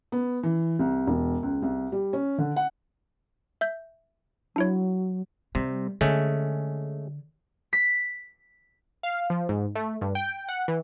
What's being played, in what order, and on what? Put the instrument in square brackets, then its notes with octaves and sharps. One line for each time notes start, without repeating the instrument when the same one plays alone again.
[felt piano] B3
E3
C2
E1
C#2
C2
G3
C#4
D3
F#5
[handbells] E5 G6
[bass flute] F#3 [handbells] D4 E4 C#5
[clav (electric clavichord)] C3 [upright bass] G3
[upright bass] D3 [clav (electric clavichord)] G#3 A3 C#4
[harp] B6
[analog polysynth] F5
F3
G#2
A3
G2
G5
F#5
E3